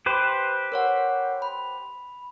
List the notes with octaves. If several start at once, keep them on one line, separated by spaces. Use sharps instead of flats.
G4 B4 C5
A#4 C#5 F#5
B5